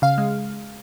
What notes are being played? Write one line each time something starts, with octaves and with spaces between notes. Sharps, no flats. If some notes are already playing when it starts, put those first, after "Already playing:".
C#3 F5
G#3